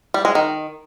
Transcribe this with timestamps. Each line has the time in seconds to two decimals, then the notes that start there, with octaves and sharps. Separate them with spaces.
0.14 G3
0.25 G#3
0.35 D#3